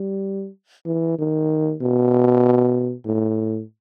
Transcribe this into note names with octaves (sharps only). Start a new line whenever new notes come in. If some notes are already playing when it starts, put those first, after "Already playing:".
Already playing: G3
E3
D#3
B2
A2